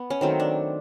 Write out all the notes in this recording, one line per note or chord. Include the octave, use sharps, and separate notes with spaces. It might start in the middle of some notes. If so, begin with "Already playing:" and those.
Already playing: B3
C#4
D#3 F#3 A3 C4
D4